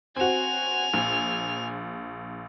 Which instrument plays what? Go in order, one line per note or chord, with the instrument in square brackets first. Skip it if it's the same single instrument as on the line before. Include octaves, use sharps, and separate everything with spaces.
[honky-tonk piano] C4 F#4 [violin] G#5 F7
[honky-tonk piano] A#1